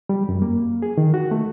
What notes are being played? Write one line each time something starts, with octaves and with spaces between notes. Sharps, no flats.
G3
F#2
A#3
G#4
D#3
F#4
A3